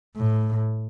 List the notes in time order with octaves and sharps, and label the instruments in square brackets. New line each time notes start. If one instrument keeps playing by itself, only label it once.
[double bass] A2